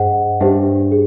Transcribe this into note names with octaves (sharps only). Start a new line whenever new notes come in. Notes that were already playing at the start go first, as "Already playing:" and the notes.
Already playing: G2 G#4 C5 D#5 F#5
G2 D4 G4 C5 E5
G#4